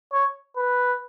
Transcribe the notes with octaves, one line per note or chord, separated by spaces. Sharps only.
C#5
B4